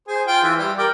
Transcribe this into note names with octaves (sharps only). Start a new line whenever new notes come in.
G#4 C5
F4 F5 G5
E3 E5
G3
A#4 D5 G5